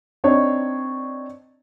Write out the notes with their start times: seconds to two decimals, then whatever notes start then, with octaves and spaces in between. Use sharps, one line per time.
0.24 C4 D4 D#4 C#5